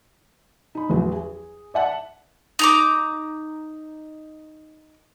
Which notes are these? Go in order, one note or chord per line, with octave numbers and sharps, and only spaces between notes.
D#4 B5
A1 E2 F#3 E4
G#4
D5 E5 F#5 A5
D#4 A#5 D6